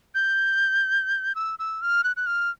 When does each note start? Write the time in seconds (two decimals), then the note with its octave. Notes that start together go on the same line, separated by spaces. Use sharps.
0.15 G6
1.35 E6
1.59 E6
1.82 F6
2.04 F#6
2.17 F#6
2.26 F6